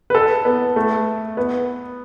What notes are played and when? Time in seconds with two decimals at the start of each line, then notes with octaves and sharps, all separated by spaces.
0.10 B4
0.15 A4
0.45 B3
0.76 A3
1.37 B3